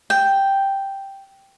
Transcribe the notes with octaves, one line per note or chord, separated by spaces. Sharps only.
G5